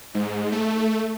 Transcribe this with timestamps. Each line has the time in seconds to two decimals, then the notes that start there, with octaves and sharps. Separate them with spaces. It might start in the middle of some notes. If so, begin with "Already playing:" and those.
0.14 G#2
0.52 A3